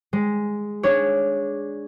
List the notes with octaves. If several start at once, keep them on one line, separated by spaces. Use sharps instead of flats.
G#3
D4 G#4 C#5